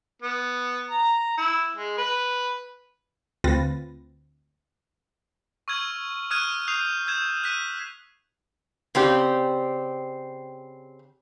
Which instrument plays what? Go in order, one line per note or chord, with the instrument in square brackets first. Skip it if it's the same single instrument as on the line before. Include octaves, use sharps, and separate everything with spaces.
[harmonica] B3
A#5
E4
G#3
B4
[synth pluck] D2 C4 F4 B4 A6 A#6
[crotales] C#6 E6 F6 G#6 D#7 F#7
C#6 D#6 F6 F#6 G#6 D#7
C#6 D#6 G6 C7 F7
E6 G6 G#6 E7
E6 F#6 B6 D#7
[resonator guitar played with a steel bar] C#3 C4 G4 D5